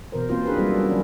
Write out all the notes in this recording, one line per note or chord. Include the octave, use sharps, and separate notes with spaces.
B2 E3 A#4 C5
A#3 C4 C#4 F4 C5
D4 E4 G#4 A#4 B4
F#3 G3 A#3 B3 E4 A4
G3 C#4
D#3 F#3 C#4